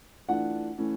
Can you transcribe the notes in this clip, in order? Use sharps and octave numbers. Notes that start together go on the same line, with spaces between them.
E3 A3 D4 F4 F#5
E3 A3 C#4 E4